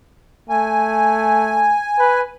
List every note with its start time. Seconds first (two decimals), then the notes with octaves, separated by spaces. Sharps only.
0.49 A3 G#5
1.99 B4